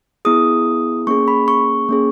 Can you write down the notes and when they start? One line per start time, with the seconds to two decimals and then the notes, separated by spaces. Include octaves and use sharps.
0.25 B3 E4 G#4 D#6
1.07 A#3 C#4 G#4 C#6
1.28 B5
1.48 C#6
1.89 A#3 C#4 G#4